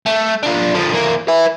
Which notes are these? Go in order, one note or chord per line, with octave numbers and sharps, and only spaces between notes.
A3
D4 F4
D3 F3
E3 A#3
B4 E5